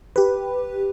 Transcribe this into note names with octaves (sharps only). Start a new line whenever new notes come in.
G4 B4